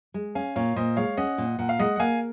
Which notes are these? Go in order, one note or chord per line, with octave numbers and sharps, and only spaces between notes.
G#3
C#4 F5 G#5
A#2 C#5 F5
A#2 C5 D#5
G#3 C#5 F5
C#4 D#5 F#5
A#2
A#2 F#5
F5
G#3 D#5 F#5
F#5
A#3 F5 G#5